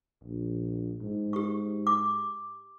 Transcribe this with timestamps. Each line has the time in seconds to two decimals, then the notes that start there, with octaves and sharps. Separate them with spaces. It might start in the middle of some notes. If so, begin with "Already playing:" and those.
0.24 A#1
1.02 G#2
1.33 G4 C#6
1.87 D6